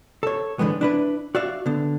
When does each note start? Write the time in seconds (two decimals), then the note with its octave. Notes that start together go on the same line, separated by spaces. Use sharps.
0.23 A4 C#5
0.59 D3 E3 G#3 B3
0.81 D4 E4 B4
1.35 F#4 D5 E5 F5
1.66 D3 B3